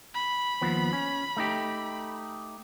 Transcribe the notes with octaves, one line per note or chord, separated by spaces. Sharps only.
B5
D#2 F3 B3
C#4
A3 D#4 G4